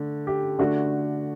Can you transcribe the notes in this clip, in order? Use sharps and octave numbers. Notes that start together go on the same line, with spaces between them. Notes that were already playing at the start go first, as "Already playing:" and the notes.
Already playing: D3 A3
G4
D3 A3 D4 F#4